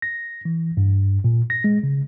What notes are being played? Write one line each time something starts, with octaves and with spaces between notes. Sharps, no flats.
A#6
E3
G2
A#2
A#6
G#3
C#3